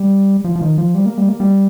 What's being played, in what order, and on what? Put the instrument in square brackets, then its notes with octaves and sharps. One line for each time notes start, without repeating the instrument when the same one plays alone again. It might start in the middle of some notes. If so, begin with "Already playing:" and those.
Already playing: [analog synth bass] G3
F3
F3
D#3
F3
G3
A#3
G3
A#3
G3